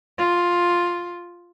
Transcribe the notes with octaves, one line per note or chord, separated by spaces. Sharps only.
F4